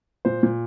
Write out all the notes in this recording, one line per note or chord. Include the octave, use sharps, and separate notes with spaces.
A#2 C5
A#2